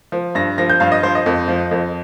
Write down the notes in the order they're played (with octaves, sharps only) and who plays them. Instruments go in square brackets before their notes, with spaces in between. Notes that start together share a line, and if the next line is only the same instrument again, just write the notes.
[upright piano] F3
G2 A#6
F3 A#6
G6
G2 F5
D#5
F3 C5
D#5
F2
F3
F2